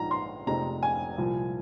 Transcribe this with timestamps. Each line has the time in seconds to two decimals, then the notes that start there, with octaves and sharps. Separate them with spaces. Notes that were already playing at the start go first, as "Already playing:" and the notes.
Already playing: A#1 G#2 F3 A#5
0.11 C6
0.47 F1 F2 C3 G#3 D#4 A#5
0.83 G#5
1.18 C2 A#2 F3